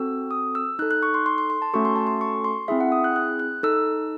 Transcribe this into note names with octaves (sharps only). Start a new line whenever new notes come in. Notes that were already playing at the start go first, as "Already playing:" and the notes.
Already playing: C4 F#4 A4 E6
D#6
E6
D#4 A4 F#6
F#6
C#6
C6
C6
C6
C6
A5
A3 C#4 F#4 A4 C#6
C6
A5
C6
C#6
C6
C4 E4 G#4 E5
F#5
D#6
F#6
F#6
F#6
D#4 A4 E6